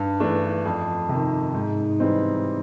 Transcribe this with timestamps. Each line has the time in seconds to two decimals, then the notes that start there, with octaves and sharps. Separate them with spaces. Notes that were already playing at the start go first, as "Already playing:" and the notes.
Already playing: G2
0.20 E3 A3 D4
0.66 F2
1.09 C3 D#3
1.54 G#2
2.00 E3 G3 C4 D#4